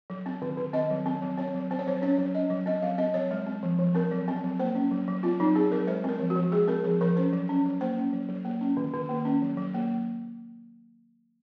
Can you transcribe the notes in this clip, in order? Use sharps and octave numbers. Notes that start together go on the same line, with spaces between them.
F#3
C4
D#3
D#3
C4 D#5
F#3
C4
F#3
C4 C#5
F#3
C4 C5
C#5
F#3 C5
C#4 C#5
F#3
C#4 D#5
F#3
C4 D#5
F#3 F5
C4 D#5
F#3 C#5
G#3
C4
F3
F3
C4 A#4
F#3
C4
F#3
A#3 C5
C#4
F#3
F#3
C4 F4
F#3 D#4
C4 G#4
F#3 A#4
G#3 C5
C4 A#4
F3
F#4
F3
G#3 G#4
C4 A#4
F3 G#4
F3 A#4
C#4 C5
F#3
C#4
F#3
A#3 C5
C#4
F#3
F#3
A#3
C#4
D#3
D#3
A#3
C#4
F#3
F#3
A#3